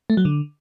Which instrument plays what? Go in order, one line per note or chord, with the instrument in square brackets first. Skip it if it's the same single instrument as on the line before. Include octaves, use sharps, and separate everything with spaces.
[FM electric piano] A3
F#3
D3